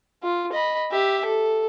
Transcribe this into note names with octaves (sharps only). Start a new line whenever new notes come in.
F4
D#5 B5
G4 E5
A4